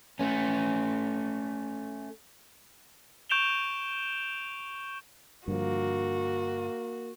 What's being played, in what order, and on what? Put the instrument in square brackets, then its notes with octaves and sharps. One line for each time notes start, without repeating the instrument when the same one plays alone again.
[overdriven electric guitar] A3 C#4
[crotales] C#6 G6 D7 E7 F7 G7
[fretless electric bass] G2 D3 F3 [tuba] A#3 [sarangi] F#4